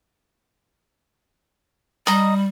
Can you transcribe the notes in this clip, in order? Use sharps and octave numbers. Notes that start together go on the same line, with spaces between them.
G3 D#5 A#5